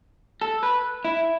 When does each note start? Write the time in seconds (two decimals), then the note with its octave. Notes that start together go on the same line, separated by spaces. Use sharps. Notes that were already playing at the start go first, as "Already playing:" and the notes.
0.41 A4
0.63 B4
1.05 E4